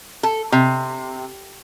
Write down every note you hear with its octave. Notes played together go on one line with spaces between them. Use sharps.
A4
C3